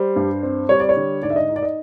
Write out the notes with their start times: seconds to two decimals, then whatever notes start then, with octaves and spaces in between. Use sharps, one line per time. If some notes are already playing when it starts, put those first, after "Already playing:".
Already playing: G3 C5
0.16 G2
0.43 C4
0.69 G3 C#5
0.80 D5
0.89 C#5
0.96 D3
1.23 G#2 D5
1.30 E5
1.36 D#5
1.49 D#4
1.56 D5
1.63 D#5